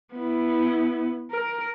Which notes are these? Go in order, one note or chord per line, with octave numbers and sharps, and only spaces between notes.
B3 E4
A#4